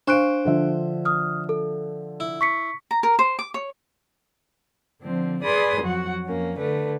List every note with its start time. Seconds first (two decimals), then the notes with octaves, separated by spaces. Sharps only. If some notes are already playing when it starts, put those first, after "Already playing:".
0.08 D4 C5 F5 C#6 F#6 D7
0.45 D3 F3 E5
1.05 D#6 F6
1.49 A4
2.20 E4
2.41 C#6 B6 C#7
2.91 A#5
3.03 A#4
3.19 C5
3.39 D6
3.54 C#5
5.02 D3 F3 C4
5.43 G#4 B4 D5 B5 C6 D#6
5.81 F2 F#3 F#4 F#5
6.26 F2 A#3 C#4
6.57 D3 A3 B4